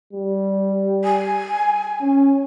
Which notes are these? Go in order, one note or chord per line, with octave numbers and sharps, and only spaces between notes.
G3
G#5
C#4